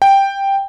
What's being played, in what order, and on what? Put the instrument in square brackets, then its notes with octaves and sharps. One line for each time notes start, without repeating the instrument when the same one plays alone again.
[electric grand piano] G5